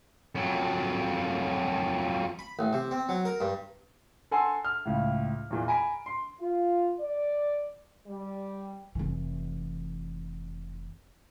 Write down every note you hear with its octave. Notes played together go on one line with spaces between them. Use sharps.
F2 F#3
B5
A1
C3
C4
F#3
A#4
G2
A4 F#5 G#5 A5 C6 E6
F6
C#2 A2
E2 A#2 E3
G#5 A#5 B5 D7
C6
F4
D5
G3
F1 E3